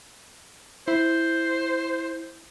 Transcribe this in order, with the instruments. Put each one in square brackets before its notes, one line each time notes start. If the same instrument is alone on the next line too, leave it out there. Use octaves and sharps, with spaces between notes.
[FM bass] E4 [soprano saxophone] C5